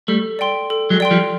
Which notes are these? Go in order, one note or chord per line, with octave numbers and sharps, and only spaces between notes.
G3 A3 A4
D5 G5 C6
A4
F#3 G#3
D5 G5 C6
F3 G3